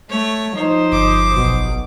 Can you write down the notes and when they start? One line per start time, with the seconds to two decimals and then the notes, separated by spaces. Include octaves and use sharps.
0.10 A3 C#5
0.57 F3 D#4 C5
0.92 G1 D6 D#6
1.33 B1 B2